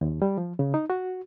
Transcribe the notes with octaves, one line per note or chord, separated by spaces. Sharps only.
D#2
G3
F3
C#3
D#4
F#4